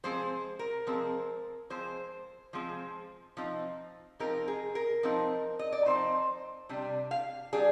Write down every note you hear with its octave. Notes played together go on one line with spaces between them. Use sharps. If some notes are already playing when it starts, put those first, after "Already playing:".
F3 G#3 C4 C5
A#4
F3 G#3 C4
F3 G#3 C4 C5
F3 G#3 C4
F3 C4 D#4
F3 C4 D#4 A#4
G#4
A#4
F3 C4 D#4
D#5
D5
F3 C4 D#4 C5
C3 G3 D4
F5
G3 D4 G#4